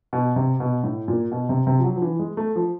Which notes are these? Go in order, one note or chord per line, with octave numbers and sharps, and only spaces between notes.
B2
C3
B2
A2
A#2
B2
C3
C3
F3
F#3
F3
E3
G#3
A3
F3